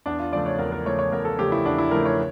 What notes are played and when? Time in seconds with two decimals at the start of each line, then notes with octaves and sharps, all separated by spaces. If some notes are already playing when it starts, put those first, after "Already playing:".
0.06 E2 D4
0.19 F4
0.32 C#3 F3 A3 D5
0.46 C#5
0.59 E2 A#4
0.72 A#4
0.85 C#3 F3 A3 C#5
0.99 C#5
1.12 E2 A#4
1.25 A4
1.39 C#3 F3 A3 G4
1.52 E4
1.65 E2 D4
1.78 E4
1.91 C#3 F3 A3 A#4
2.05 C#5